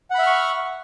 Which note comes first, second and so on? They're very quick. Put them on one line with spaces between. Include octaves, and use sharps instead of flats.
F#5 B5 E5 F6 C#6